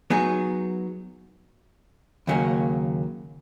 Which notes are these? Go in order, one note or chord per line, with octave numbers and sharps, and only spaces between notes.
F#3 B3 D#4 G#4
D#2 C#3 F#3 A#3